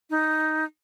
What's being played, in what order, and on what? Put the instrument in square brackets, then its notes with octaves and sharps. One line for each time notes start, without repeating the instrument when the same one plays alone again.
[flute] D#4